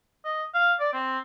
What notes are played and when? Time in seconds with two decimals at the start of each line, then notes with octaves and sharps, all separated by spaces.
0.25 D#5
0.55 F5
0.80 D5
0.93 C4